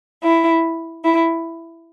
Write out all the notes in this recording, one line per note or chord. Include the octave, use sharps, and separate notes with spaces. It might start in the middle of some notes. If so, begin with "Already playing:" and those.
E4
E4